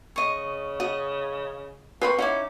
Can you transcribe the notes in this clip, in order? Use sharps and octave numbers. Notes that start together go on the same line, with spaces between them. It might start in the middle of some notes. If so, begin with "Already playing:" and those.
C#3 D#5 C#6
F#4 D#5
A#3 C4 B4 C5 B5 C#6
C#4 D#4 E4 F#5 D6